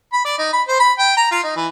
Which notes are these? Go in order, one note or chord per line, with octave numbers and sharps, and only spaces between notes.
B5
D5
D#4
B5
C5
B5
G5
A#5
F4
D#4
E3